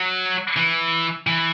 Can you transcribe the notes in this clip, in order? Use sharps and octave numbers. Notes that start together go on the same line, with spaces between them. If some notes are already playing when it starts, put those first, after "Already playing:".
Already playing: F#3
E3
E3